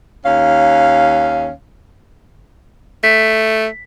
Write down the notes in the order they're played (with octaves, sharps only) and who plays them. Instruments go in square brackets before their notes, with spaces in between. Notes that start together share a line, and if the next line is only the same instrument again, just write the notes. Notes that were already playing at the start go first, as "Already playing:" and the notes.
[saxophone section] D#2 C#4 F5
[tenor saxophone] A3 [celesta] B6